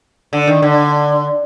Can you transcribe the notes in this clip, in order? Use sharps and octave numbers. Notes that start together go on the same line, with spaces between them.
D3
D#3
D3